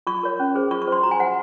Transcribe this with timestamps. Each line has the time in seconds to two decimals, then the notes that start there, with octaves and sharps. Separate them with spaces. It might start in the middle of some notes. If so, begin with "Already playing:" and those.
0.07 F4 C#6
0.23 A#4 C#5
0.40 C#4
0.55 G#4 C5
0.71 F4 C#6
0.82 C#6
0.88 C5 C6
1.03 F#4 A#5
1.11 G#5
1.20 C5 F#5